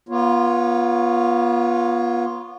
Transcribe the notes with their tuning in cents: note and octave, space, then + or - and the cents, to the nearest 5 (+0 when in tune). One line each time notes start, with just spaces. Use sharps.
B3 -30 F4 +0 C#5 +0